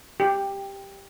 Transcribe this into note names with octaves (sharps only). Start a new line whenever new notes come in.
G4